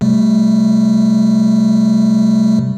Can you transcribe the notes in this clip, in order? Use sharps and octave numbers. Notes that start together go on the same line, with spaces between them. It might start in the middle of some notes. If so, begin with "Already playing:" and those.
C3 G3 A3